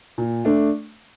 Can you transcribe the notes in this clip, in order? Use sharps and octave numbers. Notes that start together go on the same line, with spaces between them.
A#2
A3 D4